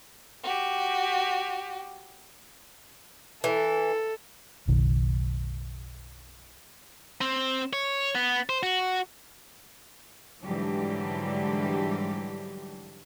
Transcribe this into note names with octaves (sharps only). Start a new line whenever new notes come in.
F#4 G4
E3 A4
F#1 B1 D#3
C4
C#5
B3
C5
F#4
G#2 D3 E3 F#3 G3 G4